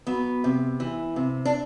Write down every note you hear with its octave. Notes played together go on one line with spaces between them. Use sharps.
F#3 B3
C3
E3
C3
D4